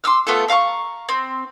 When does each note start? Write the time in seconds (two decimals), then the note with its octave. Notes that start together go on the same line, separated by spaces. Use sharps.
0.04 C6 D6 E6 F6
0.27 A3 B3 F4 A4
0.48 E5 F5 A#5 C#6
1.09 C4